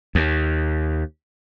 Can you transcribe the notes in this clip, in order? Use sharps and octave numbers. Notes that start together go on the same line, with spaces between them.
D#2